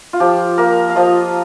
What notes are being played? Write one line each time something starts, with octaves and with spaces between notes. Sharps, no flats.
F4
F3 G4
A#3 A#4
F5
F3 D#5